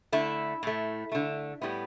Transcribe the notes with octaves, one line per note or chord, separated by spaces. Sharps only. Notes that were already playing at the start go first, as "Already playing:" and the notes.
D3 A3 E4
A2 A3
D3 A3
A2 G3 B3